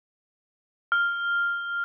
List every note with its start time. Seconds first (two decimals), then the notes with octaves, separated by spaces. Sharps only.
0.92 F6